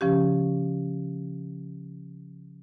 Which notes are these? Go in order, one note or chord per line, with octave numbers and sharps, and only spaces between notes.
C#3 F3 C#4 G4